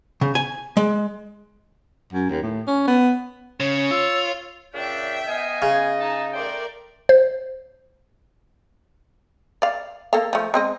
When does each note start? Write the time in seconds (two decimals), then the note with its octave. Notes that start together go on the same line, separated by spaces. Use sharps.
0.21 C#3
0.35 G#5
0.77 G#3
2.13 F#2
2.30 D#2
2.43 A2
2.67 C#4
2.87 B3
3.60 C#3 C#5
3.91 F4 E6
4.74 A#2 C#3 D4 E5 G5
5.27 B3 D#5 F5 G#5
5.62 C#3
5.99 D#4 G#4 A5
6.33 A3 A#4 C5 D5 G5
7.09 C5
9.62 D5 F5
10.13 A#3 A4 F5
10.33 F3 A3
10.54 G#3 C4 D#5